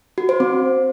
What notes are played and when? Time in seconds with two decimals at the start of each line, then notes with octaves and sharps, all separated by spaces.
0.18 F#4
0.29 C5
0.40 C4